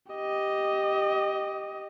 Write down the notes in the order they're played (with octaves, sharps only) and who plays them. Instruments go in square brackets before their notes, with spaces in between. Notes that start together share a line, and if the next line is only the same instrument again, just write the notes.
[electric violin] G4 D#5